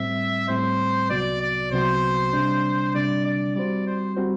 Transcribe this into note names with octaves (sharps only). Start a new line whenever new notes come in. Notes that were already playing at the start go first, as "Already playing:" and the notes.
Already playing: A2 G3 C4 E5
A2 G3 C4 C5
C2 C3 F#3 B3 F#4 D5
D5
C2 C3 F#3 B3 F#4 C5
C3 G3 D4
C3 G3 D4 D5
D5
G3 C4 F#4 C5 D5
C5
G3 C4 F#4 C5